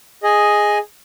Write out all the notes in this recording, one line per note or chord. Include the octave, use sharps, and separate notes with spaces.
G#4 D#5 G#5